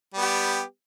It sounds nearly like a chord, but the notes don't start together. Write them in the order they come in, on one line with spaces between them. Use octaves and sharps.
G3 B3 G4